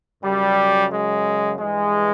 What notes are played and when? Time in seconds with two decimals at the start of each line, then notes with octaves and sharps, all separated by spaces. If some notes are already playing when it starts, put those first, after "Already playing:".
0.22 F#2 C#3 F#3 G3
0.91 G#3
1.60 G2 E3 G#3